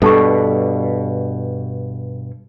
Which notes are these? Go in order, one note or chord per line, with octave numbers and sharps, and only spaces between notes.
G2 B2 A4 A5 C#6